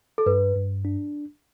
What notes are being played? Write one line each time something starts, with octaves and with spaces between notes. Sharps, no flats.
A4
G2 B4
G2
D4